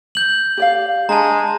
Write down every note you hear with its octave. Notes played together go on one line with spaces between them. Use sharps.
G6 F#7
G4 D5 F5
G#3 D4 A5 A#5